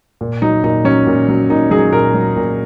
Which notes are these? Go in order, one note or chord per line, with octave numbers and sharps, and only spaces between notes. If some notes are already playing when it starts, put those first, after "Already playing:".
A#2
F#3 D#4
A#2 D#4
F#3 C#4
A#2
F#3
A#2 D#4
F#3 G#4
A#2 A#4
F#3
A#2